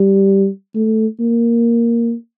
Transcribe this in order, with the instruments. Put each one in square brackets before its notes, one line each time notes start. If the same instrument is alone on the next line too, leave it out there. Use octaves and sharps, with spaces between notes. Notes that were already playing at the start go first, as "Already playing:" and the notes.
Already playing: [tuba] G3
A3
A#3